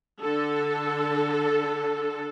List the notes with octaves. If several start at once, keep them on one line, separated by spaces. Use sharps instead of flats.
D3 A4